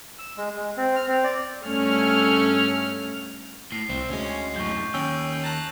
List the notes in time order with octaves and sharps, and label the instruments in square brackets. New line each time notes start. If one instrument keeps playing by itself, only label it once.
[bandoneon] E6
G#3
G#3
C4
F6
C4
D5
[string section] G2 A3 C#4 F6
[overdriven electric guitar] A2 [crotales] C7
[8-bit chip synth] C2 [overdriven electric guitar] C4
[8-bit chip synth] D2 G#3 [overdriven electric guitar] C#4
[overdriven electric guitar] F#2 A2 [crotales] C#6 G6
[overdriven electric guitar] D#2 [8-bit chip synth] C#4 G5 [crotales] E6
[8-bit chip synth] A5 A#5 F#6